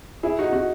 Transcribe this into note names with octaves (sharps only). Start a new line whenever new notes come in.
E4 G#4
D#4 F#4
D#4 F#4